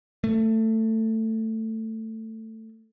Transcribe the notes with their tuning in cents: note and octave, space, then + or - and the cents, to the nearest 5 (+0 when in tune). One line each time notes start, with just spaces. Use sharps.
A3 +15